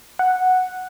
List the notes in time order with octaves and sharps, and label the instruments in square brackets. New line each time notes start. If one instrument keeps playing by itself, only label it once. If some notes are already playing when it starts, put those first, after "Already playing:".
[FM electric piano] F#5